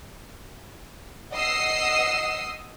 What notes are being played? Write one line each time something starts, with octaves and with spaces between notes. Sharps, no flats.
D#5 F#5 D#6 E6 C7